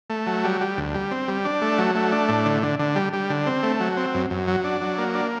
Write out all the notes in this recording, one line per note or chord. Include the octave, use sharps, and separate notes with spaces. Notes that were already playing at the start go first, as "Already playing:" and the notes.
A3
F#3
G3
G3
D2
G3
C4
G3
D4
A3
F#3
A3
D4
A2
D3
D3
D3
G3
G3
D3
C4
A3
F#3
C4
F#2
F#2
F#3
D4
F#3
A#3
D4